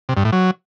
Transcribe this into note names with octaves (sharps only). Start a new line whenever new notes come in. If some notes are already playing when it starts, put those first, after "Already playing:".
C3
G2
A2
F#3